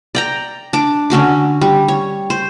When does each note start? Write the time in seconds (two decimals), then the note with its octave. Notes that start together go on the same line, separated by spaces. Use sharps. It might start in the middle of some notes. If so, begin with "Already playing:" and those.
0.15 D5 G5 A#5
0.73 D4 D6
1.10 D3 C#4 F#4 D6
1.61 G3
1.88 C#5
2.30 C5